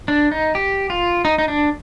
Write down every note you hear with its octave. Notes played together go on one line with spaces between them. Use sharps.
D4
D#4
G4
F4
D#4
D#4
D4